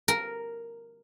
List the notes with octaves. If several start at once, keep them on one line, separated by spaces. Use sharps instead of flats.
A#4